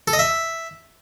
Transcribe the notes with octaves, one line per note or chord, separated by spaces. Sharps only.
A4
D#5
E5